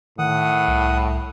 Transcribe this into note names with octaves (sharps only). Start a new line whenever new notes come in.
A2 D#3 F#5 D#6
C2